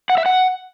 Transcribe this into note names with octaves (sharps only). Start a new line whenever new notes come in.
F#5
E5
F#5